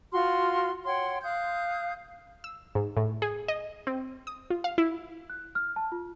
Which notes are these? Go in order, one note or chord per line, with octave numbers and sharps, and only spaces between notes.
F4 F#4 C6 F6
C#5 F#5 G5 C6
F5 D#6 F#6 G6
E6
G#2
A2
G#4
D#5
C4
D#6
F4
F5
E4
F#6
F6
A5
F4